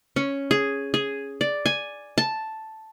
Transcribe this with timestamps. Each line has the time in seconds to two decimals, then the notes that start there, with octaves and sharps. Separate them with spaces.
0.16 C#4
0.51 G#4
0.94 G#4
1.41 D5
1.66 G#5
2.18 A5